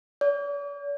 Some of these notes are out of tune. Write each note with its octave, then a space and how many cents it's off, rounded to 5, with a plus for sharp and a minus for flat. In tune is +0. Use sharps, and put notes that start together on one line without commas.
D5 -45